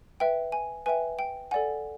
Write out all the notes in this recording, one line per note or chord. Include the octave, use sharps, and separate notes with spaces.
B4 E5 G5
G#5
B4 E5 G5 G#5
G5
A4 D5 F#5 G#5